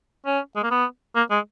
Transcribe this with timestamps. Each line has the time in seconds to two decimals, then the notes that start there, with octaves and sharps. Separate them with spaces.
0.26 C#4
0.56 G#3
0.63 A#3
0.71 B3
1.16 A#3
1.31 G#3